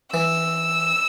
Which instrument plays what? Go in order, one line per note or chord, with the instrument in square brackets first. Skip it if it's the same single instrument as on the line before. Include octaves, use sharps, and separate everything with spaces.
[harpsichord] E3 [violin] E6